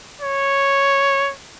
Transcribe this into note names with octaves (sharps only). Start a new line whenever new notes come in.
C#5